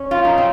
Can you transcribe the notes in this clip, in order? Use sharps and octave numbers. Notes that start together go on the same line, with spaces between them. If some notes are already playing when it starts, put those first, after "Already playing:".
Already playing: C#4
F4
D#4
C4